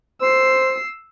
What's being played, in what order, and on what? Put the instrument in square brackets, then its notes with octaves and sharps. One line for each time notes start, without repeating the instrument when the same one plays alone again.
[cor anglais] C5 [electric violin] E6 C7